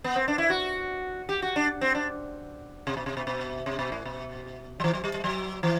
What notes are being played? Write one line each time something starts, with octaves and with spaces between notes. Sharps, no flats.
B3
C4
D4
E4
F#4
G4
F#4
D4
C4
D4
C3
B2
C3
B2
B2
C3
B2
A2
B2
F#3
E3
F#3
G3
G3
F#3
E3